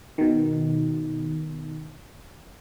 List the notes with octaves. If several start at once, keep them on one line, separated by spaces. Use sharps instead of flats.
B2 D#3